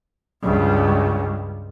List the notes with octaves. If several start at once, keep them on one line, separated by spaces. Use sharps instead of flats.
C#2 G2